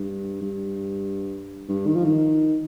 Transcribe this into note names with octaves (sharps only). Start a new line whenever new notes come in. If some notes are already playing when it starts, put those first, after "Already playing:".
Already playing: G2
G2
G2
D#3
F3
D#3